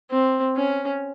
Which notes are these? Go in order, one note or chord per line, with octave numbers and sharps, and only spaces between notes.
C4
C#4